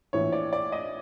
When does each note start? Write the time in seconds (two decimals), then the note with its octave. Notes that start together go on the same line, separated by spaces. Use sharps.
0.13 A#1 A2 E3 C#5
0.32 D5
0.53 D5
0.72 D#5